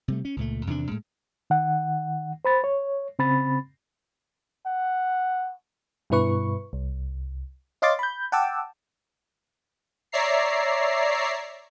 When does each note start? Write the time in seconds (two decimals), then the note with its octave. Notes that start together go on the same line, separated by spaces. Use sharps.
0.08 C3 G3 A3
0.25 C#4
0.37 C#2 A#2 A3
0.67 E2 C3 D#3 D4
0.89 A2 G#3
1.50 D#3 F#5
2.45 C5 B5 A6
2.64 C#5
3.19 C#3 C4 B5 A6
4.66 F#5
6.10 G2 B2 E4 B4 C#6
6.73 C2
7.82 C#5 D#5 F5 C6 D6 A6
7.99 B5 G6
8.32 F#5 G5 A5 D6 E6
10.12 C#5 D5 E5 A#5 C7